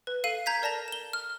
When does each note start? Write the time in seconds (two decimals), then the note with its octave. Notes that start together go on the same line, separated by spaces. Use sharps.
0.07 B4
0.24 A4 F5 D#7
0.46 A#5 G6 G#6 B6
0.62 A#4 D5 A5 A#6 F7
0.88 E7 G7
1.13 F6